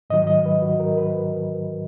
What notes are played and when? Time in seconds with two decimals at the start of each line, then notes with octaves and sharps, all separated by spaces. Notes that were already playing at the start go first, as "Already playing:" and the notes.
0.10 G#2 D#3 F#3 D#5
0.27 D#5
0.46 B4
0.62 F#4
0.80 A#4
0.97 B4